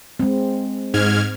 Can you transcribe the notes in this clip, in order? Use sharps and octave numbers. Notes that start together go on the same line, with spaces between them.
G#3 C4
G#2 F6 G#6